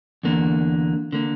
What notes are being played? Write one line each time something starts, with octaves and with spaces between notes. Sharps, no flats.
E2 D3 A#3
D3 A#3